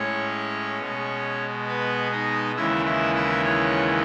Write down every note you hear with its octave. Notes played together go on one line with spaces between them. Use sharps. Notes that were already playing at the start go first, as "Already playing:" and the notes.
Already playing: A2 G#3 C#4 C#5
B2 G#3
B3 B4
D#4 D#5
D#2 C#3 E3 G#3 E4 E5
E4 E5
E4 E5
C#4 C#5